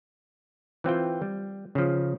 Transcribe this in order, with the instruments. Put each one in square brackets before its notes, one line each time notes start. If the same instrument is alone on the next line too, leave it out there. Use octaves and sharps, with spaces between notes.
[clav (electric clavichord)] E3 C4 F4 G5
G3
C#3 F3